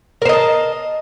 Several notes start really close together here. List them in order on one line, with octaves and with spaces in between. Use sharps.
A#4 C5 D#5 A5